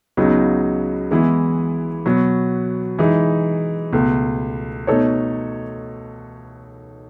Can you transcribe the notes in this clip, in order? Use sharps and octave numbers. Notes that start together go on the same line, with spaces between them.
C#2 C#3 F#3 B3 D#4
E3 G#3 B3 E4 G#4
B2 F#3 B3
E3 G#3 D#4
C#2 B2 A3
B2 A3 D#4 A4 C#5